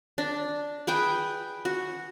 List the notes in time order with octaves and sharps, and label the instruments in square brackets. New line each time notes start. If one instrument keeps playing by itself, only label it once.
[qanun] D4
G#4 B4 G5
F#4